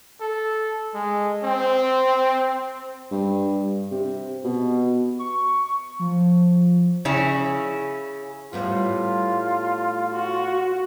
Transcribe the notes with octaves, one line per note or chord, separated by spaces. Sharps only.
A4
G#3
C4
G2
C3
B2
C#6
F3
C#3 C#4 E4
A2 G3 B3 F4
F#4